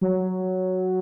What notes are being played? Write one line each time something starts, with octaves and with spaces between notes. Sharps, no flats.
F#3